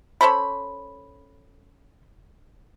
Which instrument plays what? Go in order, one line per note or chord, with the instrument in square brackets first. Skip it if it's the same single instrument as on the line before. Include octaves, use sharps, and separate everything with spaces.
[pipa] C#4 A4 C5 B5